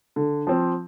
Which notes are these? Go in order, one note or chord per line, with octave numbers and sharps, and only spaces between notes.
D3
F3 C4